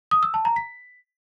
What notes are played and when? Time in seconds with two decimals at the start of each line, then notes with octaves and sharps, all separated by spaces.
0.11 D#6
0.23 E6
0.34 A5
0.45 A#5
0.56 B6